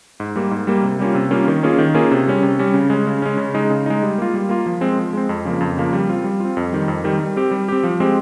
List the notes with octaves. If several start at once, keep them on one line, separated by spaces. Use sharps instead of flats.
G#2
G3 A#3
G#2
G3 A#3
C3
G3 A#3 C#4 F4
C3
G3 A#3 C#4 F4
D#3
A#3 C#4 F4 G#4
D#3
A#3 C#4 F4 G#4
C3
G3 C#4
C3
G3 C#4
C#3
G#3 C#4
C#3
G#3 C#4
C#3
G#3 D#4
C#3
G#3 D#4
G3
A#3 F4
G3
A#3 F4
F3
G#3 C4
F3
G#3 C4
F2
C#3 F3 A#3
F2
C#3 F3 A#3
G3
C4 F4
G3
C4 F4
F2
D#3 G3
F2
D#3 G3
G3
C4 G4
G3
C4 G4
F3
G#3 C4 G4